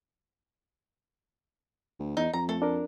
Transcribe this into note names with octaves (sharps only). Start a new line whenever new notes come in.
D2
E2 D#4
F2 A#5
A3 A4
D4 A#4